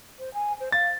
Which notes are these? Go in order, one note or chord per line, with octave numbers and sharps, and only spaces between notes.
C5
G#5
C5
F5 A6